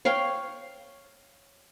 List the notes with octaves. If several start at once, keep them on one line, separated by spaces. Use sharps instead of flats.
C#5 F5 G5